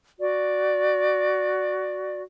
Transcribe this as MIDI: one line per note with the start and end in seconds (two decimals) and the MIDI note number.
0.19 2.22 66
0.19 2.22 74